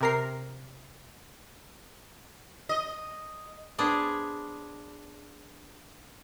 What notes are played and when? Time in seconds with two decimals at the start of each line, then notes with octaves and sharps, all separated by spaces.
0.01 C3 A#4 C7
2.69 D#5
3.78 B3 D4 G#4 C5